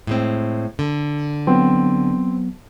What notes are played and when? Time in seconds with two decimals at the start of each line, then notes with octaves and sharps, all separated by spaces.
0.07 A2 G#3 C4
0.79 D3
1.47 F#3 B3 C4